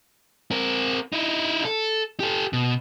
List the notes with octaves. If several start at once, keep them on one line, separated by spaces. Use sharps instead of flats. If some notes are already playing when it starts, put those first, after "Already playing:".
C4 A#4
D#4 E4
A4
G4 A4
B2